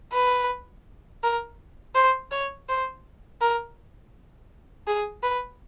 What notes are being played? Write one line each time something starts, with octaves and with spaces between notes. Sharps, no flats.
B4
A#4
C5
C#5
C5
A#4
G#4
B4